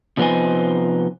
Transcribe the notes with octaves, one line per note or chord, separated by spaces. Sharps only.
C3 F3 B3 D#4 C5 G#5